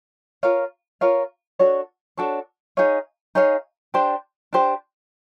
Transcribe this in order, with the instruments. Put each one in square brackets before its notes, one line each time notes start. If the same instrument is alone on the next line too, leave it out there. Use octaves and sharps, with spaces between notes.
[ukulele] F4 A#4 C#5 F5
F4 A#4 C#5 F5
D4 F#4 A4 C#5
D4 F#4 A4 C#5
D#4 G#4 C#5 F5
D#4 G#4 C#5 F5
D4 G4 C5
D4 G4 C5